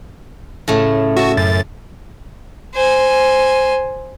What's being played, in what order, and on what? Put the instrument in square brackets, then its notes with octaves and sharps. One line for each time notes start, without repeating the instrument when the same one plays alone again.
[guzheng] A2 C#3 A3
[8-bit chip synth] F#4 [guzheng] E5 A5
[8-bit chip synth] F#2 A6
[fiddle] C5 G#5